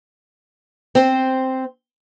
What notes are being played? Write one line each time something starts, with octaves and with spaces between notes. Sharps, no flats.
C4 C5